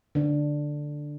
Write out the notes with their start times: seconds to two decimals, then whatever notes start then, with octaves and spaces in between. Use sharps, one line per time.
0.15 D3 D4